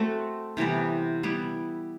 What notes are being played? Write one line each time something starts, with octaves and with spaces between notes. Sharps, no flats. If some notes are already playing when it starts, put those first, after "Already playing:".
Already playing: A3 C4 F#4 A4
C3 E3 G3 B3
G3 B3 E4